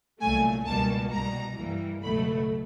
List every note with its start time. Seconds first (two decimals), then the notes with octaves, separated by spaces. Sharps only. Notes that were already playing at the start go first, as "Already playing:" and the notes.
0.21 C2 A#2 F#3 A3 G#5
0.66 C#2 B2 G3 A#3 A5
1.12 C2 B2 G3 A#5
1.57 G2 E3 G3 A#3
2.02 C#2 B2 F#3 A3 B5